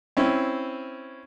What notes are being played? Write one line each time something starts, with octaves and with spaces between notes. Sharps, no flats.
C4 C#4 E4